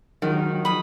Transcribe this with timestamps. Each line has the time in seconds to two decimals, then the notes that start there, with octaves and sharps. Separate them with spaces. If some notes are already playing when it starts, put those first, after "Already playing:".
0.22 D#3 F3 F#3 G#3
0.65 B5 D#6